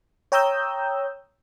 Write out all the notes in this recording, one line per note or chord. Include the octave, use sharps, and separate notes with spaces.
C#5 G5 A#5 D#6 E6 G6